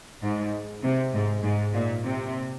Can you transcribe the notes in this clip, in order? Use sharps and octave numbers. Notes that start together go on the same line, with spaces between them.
G#2
C3
G#2
G#2
A#2
C3